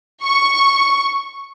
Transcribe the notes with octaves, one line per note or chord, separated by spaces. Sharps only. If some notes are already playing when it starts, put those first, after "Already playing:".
C#6